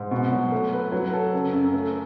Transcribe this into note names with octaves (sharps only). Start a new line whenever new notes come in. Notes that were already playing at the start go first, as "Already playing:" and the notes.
Already playing: G#2
B2
F#3
A3
B4
F#3
A4
C#3
F#2
A3